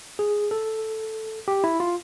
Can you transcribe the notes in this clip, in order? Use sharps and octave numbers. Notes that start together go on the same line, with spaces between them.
G#4
A4
G4
E4
F4